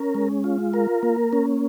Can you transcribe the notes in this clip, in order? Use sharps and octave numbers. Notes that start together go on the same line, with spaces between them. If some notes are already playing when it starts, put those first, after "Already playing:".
Already playing: C#4 A#4
G#3
F4
A#4
A#3
C#4